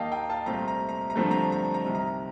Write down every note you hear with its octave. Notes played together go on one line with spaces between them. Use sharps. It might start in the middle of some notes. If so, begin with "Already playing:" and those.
Already playing: D#2 D#3 A#3 D#5 F5 G5 A5
G5 A#5
F5 A5
C2 A#2 A3 C4 A#5
A#5
A#5
A#5
G2 D3 F3 A3 C4
A#5
A#5
A#5
C2 C3 D#3
A#5